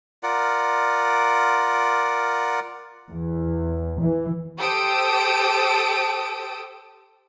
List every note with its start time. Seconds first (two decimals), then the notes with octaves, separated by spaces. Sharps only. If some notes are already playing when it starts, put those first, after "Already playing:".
0.23 F4 A#4 D5 F#5
3.09 E2
4.00 E3
4.58 G4 A4 C5 D#6 E6 D7